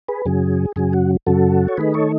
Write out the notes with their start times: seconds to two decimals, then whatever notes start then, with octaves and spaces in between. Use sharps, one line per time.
0.08 G#4 B4
0.26 F#2 C#3 F#3 G#4
0.76 F#2 C#3 F#3 G#4
0.93 F#4
1.27 F#2 C#3 F#3 F#4 A4
1.68 C#5
1.77 D#3 A3 D#4 G#4 B4
1.94 A4 C#5